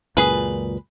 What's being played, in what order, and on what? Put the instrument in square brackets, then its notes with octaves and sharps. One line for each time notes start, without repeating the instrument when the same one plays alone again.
[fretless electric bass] C#2 F#2 A#2 [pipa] G#4 B4